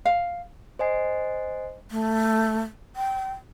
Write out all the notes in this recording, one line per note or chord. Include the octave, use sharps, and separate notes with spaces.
F5
C5 D#5 G#5 C7
A3
G5